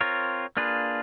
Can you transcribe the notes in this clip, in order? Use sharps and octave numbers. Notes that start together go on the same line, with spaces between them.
C4 F4 A#4 C#5
A#3 D4 F4 G#4 B4